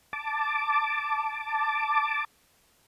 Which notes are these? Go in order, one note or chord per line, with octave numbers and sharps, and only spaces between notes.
A5 D6